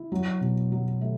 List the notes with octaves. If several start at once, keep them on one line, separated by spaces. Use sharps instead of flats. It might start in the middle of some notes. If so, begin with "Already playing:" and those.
Already playing: E4
F#3
B2
F#3
A3